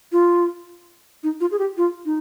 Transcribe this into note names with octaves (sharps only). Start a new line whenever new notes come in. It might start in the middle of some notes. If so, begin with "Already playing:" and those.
F4
D#4
F4
G#4
G4
F4
D#4